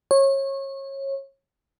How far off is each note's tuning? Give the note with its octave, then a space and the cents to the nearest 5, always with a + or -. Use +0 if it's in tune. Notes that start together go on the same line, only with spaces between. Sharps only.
C#5 -25